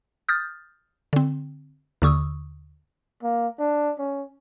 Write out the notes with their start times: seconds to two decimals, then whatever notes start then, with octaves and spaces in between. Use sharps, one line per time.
0.29 D#6 F6 G6 A6
1.13 D3 C4
2.02 D#2 D3 C#6 D#6 E6
3.23 A#3
3.59 D4
3.99 C#4